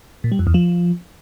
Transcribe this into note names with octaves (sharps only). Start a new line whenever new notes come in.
A#2
G3
F2
E2
F3